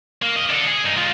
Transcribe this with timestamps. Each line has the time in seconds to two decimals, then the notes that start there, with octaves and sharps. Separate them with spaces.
0.22 A#3
0.36 C2 D#5
0.50 D4 A4
0.67 G#4
0.84 G2 D#4
0.97 G#3 F4